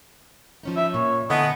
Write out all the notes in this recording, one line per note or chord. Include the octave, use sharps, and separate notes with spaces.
F3 C#4 D#4
E5
A#2 C#5
D3 E3 A3 B3 D#5